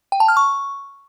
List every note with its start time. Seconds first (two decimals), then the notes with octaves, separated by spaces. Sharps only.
0.12 G5
0.20 A5
0.28 F6
0.37 C#6